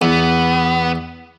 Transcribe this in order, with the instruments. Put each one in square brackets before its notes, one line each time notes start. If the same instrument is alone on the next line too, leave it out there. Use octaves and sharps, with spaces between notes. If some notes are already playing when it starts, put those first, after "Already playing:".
[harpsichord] E2 [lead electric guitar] B3